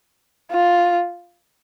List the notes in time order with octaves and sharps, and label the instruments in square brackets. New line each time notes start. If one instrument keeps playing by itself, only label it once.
[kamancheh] F4